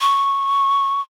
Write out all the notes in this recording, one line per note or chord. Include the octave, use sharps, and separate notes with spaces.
C#6